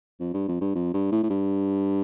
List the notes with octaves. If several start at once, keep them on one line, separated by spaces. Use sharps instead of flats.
F2
G2
F2
G2
F2
G2
A2
A2
G2